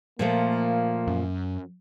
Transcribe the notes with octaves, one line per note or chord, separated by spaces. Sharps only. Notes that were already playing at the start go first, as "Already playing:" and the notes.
A#2 F3 A3 A#3
F#2